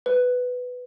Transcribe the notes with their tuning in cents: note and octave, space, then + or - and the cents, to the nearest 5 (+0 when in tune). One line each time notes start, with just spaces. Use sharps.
B4 +10